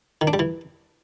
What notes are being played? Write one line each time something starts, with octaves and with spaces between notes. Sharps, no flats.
D#3
D4
G3
E3